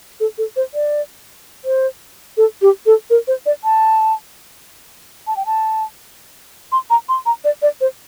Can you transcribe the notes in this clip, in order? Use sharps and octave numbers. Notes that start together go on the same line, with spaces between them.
A4
A4
C5
D5
C5
A4
G4
A4
A#4
C5
D5
A5
A5
G5
A5
C6
A#5
C6
A#5
D5
D5
C5